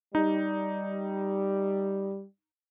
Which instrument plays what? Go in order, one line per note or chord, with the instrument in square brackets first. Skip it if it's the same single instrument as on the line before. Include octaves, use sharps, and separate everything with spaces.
[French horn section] G3 [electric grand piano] D#4